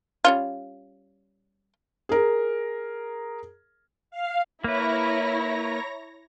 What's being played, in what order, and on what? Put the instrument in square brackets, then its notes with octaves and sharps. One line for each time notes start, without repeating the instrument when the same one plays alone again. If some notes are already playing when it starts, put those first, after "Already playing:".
[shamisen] G3 C#4 F4
[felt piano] G#4 A#4
[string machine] F5
[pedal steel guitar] A#3 B4 [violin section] E4 [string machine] C#5 A#5 A#6